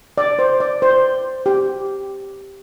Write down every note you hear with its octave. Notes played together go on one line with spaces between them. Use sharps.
D5
C5
D5
C5
G4